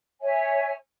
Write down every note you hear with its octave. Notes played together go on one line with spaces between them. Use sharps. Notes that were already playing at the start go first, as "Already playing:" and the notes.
C#5 E5 G#5